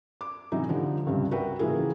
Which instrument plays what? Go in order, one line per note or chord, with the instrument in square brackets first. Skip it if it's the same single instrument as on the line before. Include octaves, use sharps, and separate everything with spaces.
[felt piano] D6
C3 E3 F#3 D#4
D3 F3 D#4 G4
C#2 G2 C3 G3
F#4 A#4 B4 E5 G5
C#3 E3 F3 A#3 E4 G#4